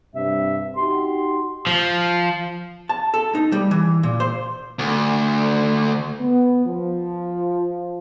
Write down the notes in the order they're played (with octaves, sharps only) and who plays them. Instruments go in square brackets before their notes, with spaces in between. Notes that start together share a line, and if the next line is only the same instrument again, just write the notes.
[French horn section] G2 C3 [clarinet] E5
[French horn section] D#4 F#4 G4 [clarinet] C6
[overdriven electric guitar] F3
[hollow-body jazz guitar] A5
A4
D#4
G3
E3
A#2
C5
[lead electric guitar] D2
[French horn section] B3
F3